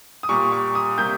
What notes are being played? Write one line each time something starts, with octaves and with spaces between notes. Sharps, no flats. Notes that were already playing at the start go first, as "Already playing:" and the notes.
D#6
A#2 G3 A#3 C#6
C#6
D#6
C3 G3 A#3 G6